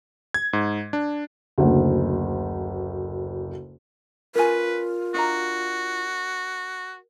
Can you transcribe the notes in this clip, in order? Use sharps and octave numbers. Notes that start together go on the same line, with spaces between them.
G#6
G#2
D4
F#1 D2
C#4 F4 A#4 B4 G#5
D4 F#4 D#5 A#5